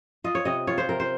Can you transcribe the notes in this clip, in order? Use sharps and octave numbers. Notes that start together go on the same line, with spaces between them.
F4 D#5
C#5
C3 D#5
F4 C#5
C5
C3 A#4
C5